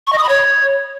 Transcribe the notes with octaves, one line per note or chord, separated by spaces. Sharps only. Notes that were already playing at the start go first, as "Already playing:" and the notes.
C#6
D#5
D#6
B5
C#5